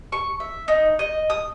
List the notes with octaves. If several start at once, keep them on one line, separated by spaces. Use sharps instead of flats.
C#6
E5
D#4
D#5
D#6